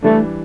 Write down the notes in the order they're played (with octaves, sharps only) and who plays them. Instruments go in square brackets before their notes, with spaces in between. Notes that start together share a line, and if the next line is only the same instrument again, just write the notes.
[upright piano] E3 G3 D4 [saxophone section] A3